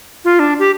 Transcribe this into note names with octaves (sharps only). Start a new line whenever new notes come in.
F4
D4
G4